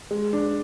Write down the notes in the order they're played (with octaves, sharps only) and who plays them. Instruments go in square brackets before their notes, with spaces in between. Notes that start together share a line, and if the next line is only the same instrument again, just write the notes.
[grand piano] G#3
D4